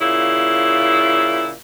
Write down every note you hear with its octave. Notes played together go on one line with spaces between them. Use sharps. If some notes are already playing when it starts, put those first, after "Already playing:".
A#2 C#3 E4